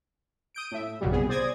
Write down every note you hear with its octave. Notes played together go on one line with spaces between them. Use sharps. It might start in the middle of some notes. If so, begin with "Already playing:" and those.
D#6 G6 D7
A2 E5
A#1 F#2 A#2 C#3 F#3 G3
C2 B3 G#4
C5 D5 D#6 G#6 A#6